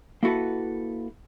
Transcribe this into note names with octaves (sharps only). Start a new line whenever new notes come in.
A#3 E4 F#4 A4 B4